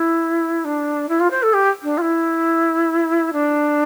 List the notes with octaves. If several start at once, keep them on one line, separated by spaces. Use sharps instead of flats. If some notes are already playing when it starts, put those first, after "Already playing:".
Already playing: E4
D4
E4
F4
C5
A4
G4
D4
F4
E4
D4